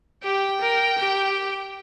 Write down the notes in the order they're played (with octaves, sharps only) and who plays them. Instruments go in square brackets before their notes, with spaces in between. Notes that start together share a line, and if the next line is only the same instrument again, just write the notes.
[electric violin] G4 [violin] G5
[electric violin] A#4
G4